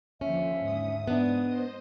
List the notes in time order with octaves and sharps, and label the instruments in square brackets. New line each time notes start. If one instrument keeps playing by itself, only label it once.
[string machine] D#2 D3 F3 [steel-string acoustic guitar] C#4 [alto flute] E5
[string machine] G#2 D#6
[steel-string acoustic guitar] B3 D4
[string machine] C5 D#5